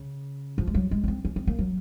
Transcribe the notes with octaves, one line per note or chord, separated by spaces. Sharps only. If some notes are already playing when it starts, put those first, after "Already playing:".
Already playing: C#3
F3
G#3
F#3
G#3
C#4
C4
C#4
C4
A#3
F#3